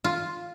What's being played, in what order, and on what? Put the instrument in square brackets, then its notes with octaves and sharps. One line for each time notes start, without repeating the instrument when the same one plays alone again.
[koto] F4